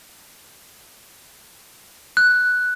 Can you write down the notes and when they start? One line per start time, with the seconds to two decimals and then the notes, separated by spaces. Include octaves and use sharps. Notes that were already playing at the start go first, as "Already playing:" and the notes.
2.17 F#6